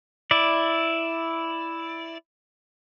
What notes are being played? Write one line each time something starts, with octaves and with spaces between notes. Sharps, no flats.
E4 D5